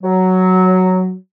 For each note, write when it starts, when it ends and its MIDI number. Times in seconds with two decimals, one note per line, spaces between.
0.01 1.12 54